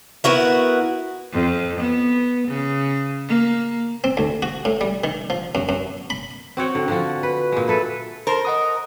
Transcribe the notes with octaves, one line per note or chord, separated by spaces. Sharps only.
B3 E4 F#4 A#4
F2
B3
C#3
A#3
C4
D2
F#4
A2
G3
D#3
F3
F#2
F#2
B5
C4 F#4 C#5 G5
D3
D3 F3 F#4
B4
A#2 G#3
E4 A4 B4
A#4 C5 A5 C6
D#5 F#5 D#6